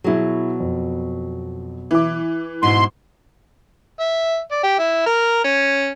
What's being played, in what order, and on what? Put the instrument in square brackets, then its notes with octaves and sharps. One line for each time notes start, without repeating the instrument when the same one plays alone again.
[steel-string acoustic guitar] B2 F#3 [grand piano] E4 G#4
[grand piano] F2
[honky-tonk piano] E3 [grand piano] E4 D6
[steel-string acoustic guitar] G#2 B2 E4 [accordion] C6
[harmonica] E5
D5
G4
E4
A#4
C#4